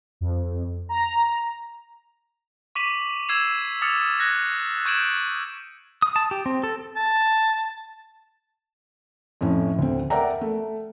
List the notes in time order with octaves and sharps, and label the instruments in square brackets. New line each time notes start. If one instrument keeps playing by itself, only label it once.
[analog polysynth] F2
A#5
[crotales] C#6 D6 B6 D#7 F#7
E6 G#6 C7 E7 F7
D6 D#6 F6 A6 C#7 F7
F#6 G#6 A#6
C#6 G6 G#6 D7 E7 F#7
[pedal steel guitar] D#6
A5
G4
C4
A4
[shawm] A5
[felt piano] F2 A2 C#4
D2 C4
A#4 D5 E5 F#5 G5 A#5
A3